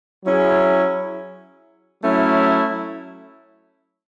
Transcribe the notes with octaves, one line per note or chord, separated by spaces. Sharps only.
F#3 C#4 E4 G#4
F#3 A3 C#4 E4